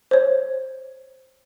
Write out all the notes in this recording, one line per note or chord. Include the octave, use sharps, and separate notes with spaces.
C5 C#5